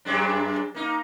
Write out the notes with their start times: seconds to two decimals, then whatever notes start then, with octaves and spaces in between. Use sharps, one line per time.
0.05 F#2 G#3 D4
0.74 A#3 D#4